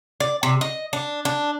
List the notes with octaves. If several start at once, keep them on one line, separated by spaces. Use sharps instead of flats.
D5
C3
D#5
D4
D4